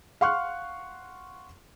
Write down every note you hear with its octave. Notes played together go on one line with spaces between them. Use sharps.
F5 F#5 C6 C#6 F6 F#6